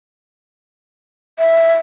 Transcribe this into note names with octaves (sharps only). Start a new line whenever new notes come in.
E5